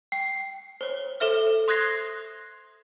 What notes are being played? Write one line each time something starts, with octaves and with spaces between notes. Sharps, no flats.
G5 C7
C5 C#5
A4 C5 E5 F6
C6 D#6 F#6 G#6 A#6 C7